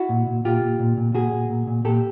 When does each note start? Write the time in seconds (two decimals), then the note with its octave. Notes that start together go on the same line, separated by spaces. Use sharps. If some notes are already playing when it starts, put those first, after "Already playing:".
Already playing: E4 F#4
0.09 A#2
0.27 A#2
0.45 A#2 F4 G4
0.62 A#2
0.79 A#2
0.97 A#2
1.14 A#2 F#4 G#4
1.32 A#2
1.49 A#2
1.67 A#2
1.85 A#2 G4 A4